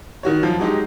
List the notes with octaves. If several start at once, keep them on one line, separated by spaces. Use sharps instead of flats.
D#3 F#4 C#5
F#2 F3
F#3 G#3 D#4 G4